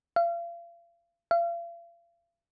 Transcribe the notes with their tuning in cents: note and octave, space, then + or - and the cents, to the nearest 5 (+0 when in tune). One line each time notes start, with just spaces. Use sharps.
F5 -40
F5 -40